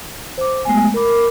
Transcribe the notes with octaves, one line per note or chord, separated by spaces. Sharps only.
C5 D6
G#3 A3 B3 G#5
A#4 B5 D6